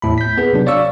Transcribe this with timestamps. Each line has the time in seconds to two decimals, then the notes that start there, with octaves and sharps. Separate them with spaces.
0.02 E2 A2 B5
0.18 G6 B6
0.38 B3 G#4 B4
0.53 C3 F#3 D4
0.66 C#5 D5 F5 C#6 E6